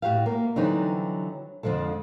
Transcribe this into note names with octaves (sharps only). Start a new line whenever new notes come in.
A2 F#4 G4 F5
A#3
D3 E3 F#3 G3 C4 D#4
F2 D3 F3 G#3 A4